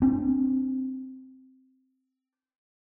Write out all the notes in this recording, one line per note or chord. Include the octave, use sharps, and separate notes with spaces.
C4 D4